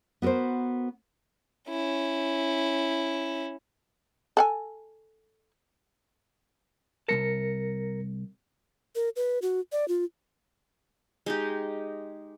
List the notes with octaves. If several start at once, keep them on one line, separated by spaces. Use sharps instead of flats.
B3 F#4 A4 A#4 C5
C#4 E4
A4 F#5 G#5
C2 G#3 A#4 A5 A#6 C#7
A#4
B4
F#4
D5
F4
G#3 D#4 G4